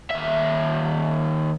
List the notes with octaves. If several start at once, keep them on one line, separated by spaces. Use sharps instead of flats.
D#2 E5